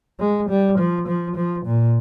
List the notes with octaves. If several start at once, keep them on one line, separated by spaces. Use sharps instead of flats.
G#3
G3
F3
F3
F3
A#2